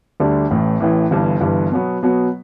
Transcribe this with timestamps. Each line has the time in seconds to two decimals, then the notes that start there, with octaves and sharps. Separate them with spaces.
0.20 D2 D3 G3 D4
0.51 A1 A2 E3
0.80 A1 A2 E3
1.11 G1 G2 E3
1.41 G1 G2 E3
1.71 B2 F#3 B3
2.03 B2 F#3 B3